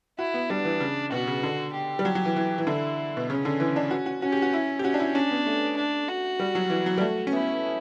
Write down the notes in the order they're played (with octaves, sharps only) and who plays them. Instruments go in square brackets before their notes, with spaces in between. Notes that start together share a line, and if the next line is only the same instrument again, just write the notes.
[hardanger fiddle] E4 [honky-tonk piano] F#4
[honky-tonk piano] B3
[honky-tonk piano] G3 [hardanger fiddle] D4
[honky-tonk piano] E3
C#3
[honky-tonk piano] B2 [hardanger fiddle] F#4
[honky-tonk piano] C#3
D3
[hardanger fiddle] G4
[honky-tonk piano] G3
F#3
F#3
E3
E3
E3
[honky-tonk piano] D3 [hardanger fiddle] E4
[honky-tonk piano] B2
[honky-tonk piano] C#3 [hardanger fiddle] C#4
[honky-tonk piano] D3
E3
D4
F#4
F#4
[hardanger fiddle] C#4 [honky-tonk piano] F#4
[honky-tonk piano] G4
F#4
E4
G4
[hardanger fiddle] C#4 [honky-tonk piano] F#4
[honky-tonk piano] D4
E4
[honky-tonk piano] C#4 [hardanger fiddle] D4
[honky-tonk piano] B3
A3
[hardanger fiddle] D4
F#4
[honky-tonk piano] G3
F#3
E3
F#3
G3
A3
C#4
[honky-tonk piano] B3 [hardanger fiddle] E4